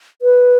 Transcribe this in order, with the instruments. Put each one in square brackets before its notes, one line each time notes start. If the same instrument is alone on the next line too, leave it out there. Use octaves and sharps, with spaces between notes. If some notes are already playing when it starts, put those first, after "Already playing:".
[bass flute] B4